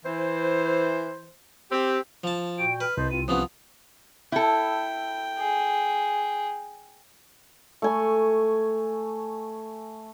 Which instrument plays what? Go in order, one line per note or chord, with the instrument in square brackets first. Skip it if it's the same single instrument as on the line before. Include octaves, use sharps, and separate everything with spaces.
[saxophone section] E3 C5
C4 G4
[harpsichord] F3 A5
[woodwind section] A#2 F#4 G5 [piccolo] D7
[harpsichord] B4 [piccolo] F6
[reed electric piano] C2 [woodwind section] D#5 A5 C6 [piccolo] G6
[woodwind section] C4 F4 [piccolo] D#7
[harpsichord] C3 F3 B3 [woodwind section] C#4 B4 [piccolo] D#6
[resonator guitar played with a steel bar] E4 A4 [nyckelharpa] G5
[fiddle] G#4
[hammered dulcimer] A3 G#5 C#6